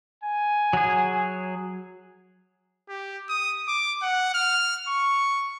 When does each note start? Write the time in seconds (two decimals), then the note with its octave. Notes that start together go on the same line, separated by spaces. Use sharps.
0.23 G#5
0.73 F#3 G#4
2.89 G4
3.29 D#6
3.68 D6
4.02 F#5
4.34 F6
4.88 C#6